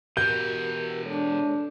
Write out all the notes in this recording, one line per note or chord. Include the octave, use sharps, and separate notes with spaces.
B2 E3 F#4 G4 A#4 G6
G#3 D4 A4 C#5